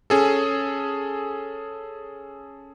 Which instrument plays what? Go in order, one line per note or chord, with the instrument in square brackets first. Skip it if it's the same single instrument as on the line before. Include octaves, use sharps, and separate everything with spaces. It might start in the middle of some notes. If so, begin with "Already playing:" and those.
[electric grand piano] C#4 G#4 A4